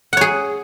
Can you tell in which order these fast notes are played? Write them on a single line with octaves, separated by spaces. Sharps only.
F#5 C#5 G#4